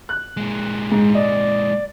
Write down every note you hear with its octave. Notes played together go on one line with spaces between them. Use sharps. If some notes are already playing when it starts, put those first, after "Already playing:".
F#6
A#2 G#3
G#2
D5 D#5